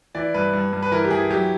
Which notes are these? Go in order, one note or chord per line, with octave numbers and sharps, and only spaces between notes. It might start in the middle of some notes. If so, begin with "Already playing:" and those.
E3 D5
G2 B4
G2
G2
B4
E3 A#4
G4
E3 G#4
F#3 G4